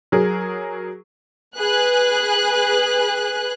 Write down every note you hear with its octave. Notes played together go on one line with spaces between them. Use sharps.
F#3 G#4 A#4
G#4 B4 F#6